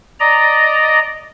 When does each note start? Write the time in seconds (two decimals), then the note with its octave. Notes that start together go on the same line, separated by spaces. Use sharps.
0.20 D5 D#5 A#5